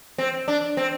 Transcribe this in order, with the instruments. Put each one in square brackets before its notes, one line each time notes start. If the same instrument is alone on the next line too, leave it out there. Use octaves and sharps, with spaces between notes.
[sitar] C4
D4
C4